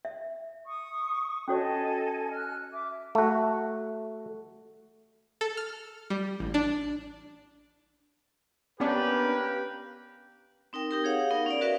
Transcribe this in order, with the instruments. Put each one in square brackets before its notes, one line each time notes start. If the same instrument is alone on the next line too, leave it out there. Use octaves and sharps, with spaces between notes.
[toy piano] E5
[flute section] C#6 D#6
[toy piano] C#4 F#4 C#5 [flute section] A4 D#5 G#5
[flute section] F6 F#6
E5 D6
[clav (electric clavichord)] A3 F#4
[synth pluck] A4
F6
G3
A1
D4
[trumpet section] A#3 G4 B4 [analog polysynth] B3 C#4 D4
[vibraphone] C4 D#4 A#4 G5
D#4 G4 A#4
G#4 C#5 F5 F#5
B3 D#4 A#4
C#4 A#4 D5
F#4 A#4 B4 E5 F5